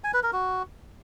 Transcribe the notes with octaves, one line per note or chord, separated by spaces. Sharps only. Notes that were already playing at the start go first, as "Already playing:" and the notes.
G#5
B4
A#4
F#4